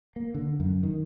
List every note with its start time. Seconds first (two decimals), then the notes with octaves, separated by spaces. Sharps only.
0.16 A#3
0.35 D3
0.60 F#2
0.83 D#3